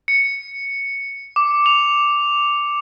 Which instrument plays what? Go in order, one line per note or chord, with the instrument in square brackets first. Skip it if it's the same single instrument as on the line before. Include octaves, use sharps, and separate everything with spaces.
[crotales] C#7
D6
F7